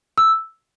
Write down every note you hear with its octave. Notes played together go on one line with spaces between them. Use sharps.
E6